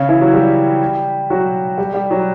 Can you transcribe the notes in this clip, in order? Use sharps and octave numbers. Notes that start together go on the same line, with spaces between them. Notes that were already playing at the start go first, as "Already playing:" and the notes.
Already playing: C#3 C#4
E3 E4
F#3 F#4
G3 G4
F#3 F#4
G3 G4
G3 G4
F#3 F#4